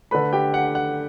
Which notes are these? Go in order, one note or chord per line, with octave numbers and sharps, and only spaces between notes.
D3 A3 B4 B5
G4 G5
F#5
F#5